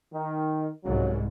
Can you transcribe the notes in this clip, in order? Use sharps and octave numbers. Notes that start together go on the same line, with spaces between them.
D#3
C2 G#2 C#3 F#3